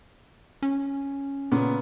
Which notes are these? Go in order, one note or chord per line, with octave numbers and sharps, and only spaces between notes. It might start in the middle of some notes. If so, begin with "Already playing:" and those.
C#4
A#2 C#3 B3